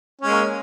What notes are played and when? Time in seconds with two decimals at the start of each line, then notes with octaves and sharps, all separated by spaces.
0.21 C#4
0.25 G#3
0.29 A#3